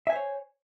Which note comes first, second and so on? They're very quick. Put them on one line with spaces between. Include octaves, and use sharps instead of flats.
E5 G#5 C5 C#5